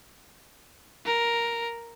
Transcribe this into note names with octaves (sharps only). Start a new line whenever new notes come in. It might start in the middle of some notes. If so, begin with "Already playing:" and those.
A#4